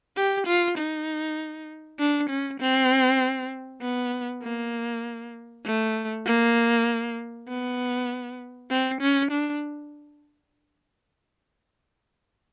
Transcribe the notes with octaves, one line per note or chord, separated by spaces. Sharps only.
G4
F4
D#4
D4
C#4
C4
B3
A#3
A3
A#3
B3
C4
C#4
D4